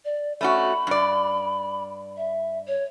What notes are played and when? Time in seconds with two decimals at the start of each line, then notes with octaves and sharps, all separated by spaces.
0.05 D5
0.41 A3 C#4 F#4 B5
0.87 G2 D5
2.17 E5
2.67 C#5